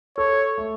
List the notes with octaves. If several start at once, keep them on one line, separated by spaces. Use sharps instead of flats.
A4 C#5
A3